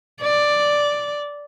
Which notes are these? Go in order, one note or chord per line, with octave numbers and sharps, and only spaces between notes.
D5